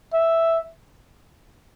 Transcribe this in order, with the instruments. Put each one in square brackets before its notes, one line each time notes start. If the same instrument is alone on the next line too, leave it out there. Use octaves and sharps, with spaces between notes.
[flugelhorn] E5